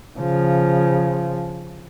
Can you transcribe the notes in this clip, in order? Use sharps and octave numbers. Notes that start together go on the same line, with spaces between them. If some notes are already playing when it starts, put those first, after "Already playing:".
C#3 F3